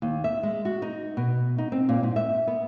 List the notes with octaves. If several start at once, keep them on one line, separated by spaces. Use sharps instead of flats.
D#2
E5
G#3
F#4
D#4
B2
D#4
C4
A#2
G#2
E5
B3